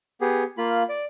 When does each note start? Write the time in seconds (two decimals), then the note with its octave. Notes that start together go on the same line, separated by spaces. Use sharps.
0.21 B3 G4 G#4
0.58 A#3 F4 B5
0.89 D5